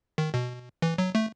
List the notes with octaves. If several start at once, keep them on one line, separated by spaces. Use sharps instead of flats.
D#3
B2
E3
F#3
A3